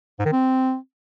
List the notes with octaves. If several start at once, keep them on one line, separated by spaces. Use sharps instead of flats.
G#2
D#3
C4